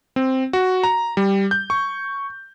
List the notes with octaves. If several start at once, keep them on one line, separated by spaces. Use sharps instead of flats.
C4
F#4
A#5
G3
G6
C#6